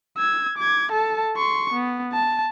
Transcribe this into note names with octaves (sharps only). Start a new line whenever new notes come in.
E6 G#6
D6 G#6
A4 A5
C6 C#6
B3
A5